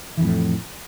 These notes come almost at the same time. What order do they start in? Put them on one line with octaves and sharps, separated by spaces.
E3 F2 A2